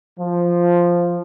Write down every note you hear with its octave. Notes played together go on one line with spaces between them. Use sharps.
F3